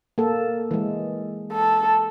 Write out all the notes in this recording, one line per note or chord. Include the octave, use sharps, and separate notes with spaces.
A#3 A4
E3 G#3
A4